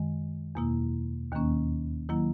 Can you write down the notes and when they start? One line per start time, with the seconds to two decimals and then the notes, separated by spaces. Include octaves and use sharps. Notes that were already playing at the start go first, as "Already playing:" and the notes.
Already playing: F#2 D#3 G#3
0.55 E2 B2 A#3 E4
1.32 D#2 D#3 A#3 C#4
2.09 D#3 F#3 A#3 E4